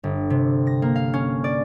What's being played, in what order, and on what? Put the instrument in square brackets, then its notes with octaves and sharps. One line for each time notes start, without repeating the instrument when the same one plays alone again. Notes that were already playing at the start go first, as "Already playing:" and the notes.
[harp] G1
C3
A#6
A#3
F5
C#4
D5